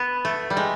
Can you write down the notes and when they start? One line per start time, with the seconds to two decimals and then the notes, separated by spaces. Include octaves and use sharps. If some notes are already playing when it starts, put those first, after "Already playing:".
Already playing: B3
0.25 A3
0.50 G3
0.57 G#3